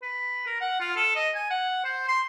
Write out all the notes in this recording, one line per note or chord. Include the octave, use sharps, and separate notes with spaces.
B4
A#4
F#5
F4
A4
D#5
G#5
F#5
C5
C6